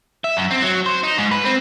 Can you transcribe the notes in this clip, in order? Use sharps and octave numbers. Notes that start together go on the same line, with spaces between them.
E5
F#2
C4
F#3
C5
D#4
G#2
B4
C4